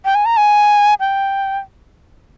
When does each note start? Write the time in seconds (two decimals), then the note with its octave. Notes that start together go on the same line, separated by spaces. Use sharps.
0.05 G5
0.15 G#5
0.25 A#5
0.37 G#5
1.00 G5